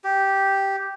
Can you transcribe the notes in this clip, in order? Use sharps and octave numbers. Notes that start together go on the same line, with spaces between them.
G4